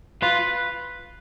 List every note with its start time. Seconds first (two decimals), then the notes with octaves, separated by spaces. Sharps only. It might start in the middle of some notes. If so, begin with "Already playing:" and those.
0.22 F4 B4